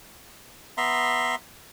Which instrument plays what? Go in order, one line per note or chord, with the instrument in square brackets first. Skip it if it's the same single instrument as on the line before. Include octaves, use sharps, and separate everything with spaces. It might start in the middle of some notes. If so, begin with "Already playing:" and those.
[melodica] B3 E5 A#5 C6